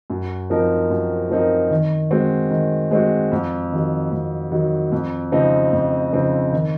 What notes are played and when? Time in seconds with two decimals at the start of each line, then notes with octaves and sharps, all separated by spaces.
0.10 F#2
0.50 F3 C4 D#4 A#4
0.90 F#2
1.30 F3 C4 D#4 A#4
1.71 D#3
2.11 G#3 C4 F#4
2.51 D#3
2.91 G#3 C4 F#4
3.32 F2
3.72 D#3 F#3
4.12 F2
4.52 D#3 F#3
4.92 F2
5.32 C#3 F3 C4 D#4
5.73 F2
6.13 C#3 F3 C4 D#4
6.53 D#3